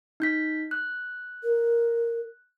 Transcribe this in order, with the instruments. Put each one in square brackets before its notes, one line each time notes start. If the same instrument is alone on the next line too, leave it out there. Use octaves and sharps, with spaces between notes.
[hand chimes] D#4 G6 B6
F#6
[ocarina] A#4